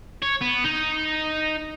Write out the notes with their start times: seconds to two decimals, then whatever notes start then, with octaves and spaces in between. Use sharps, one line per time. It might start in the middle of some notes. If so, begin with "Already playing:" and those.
0.23 C#5
0.42 B3
0.65 D#4